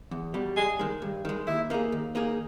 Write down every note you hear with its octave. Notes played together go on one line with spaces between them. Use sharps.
E2
B2 G3
G2 G#4
D#3 G#3
G2
D#3 G#3
D#2 E4
D#3 A#3 D#4 G#4
D#2
D#3 A#3 D#4 G#4